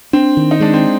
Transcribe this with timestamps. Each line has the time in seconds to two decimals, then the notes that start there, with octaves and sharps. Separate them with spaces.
0.13 C4 D4
0.37 D#3
0.51 D#4
0.60 G#3 D4
0.74 C4